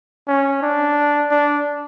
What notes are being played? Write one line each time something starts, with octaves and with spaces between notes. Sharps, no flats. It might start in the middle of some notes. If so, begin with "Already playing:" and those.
C#4
D4
D4